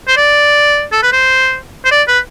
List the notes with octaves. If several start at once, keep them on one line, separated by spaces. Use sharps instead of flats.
C5
D5
A4
B4
C5
C5
D5
B4